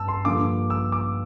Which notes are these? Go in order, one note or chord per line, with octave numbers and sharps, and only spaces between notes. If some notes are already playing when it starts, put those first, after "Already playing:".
Already playing: G2 A5 E6
C6
G2 D3 F3 A#3 F4 D6
E6
D6